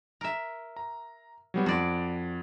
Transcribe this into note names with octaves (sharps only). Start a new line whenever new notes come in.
A#4 E5
A#5
F#3 G3 B3
F2 F#4 D5 C6